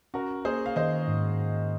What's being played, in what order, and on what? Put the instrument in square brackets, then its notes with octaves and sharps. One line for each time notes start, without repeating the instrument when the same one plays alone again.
[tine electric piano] C#4 [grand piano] F#4 A#4
[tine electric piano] A#3 [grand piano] G#4 C5
[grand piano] F5
[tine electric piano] D#3 [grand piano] C5 D#5
[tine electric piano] G#2